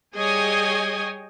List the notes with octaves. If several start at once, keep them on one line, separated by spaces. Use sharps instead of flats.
G3 G#4 C#5 D#5 G5 G#5